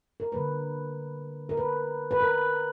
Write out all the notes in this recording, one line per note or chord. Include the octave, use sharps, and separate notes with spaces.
A#4
D3 G3 A#3 B4
A#4
B4
B4
A#4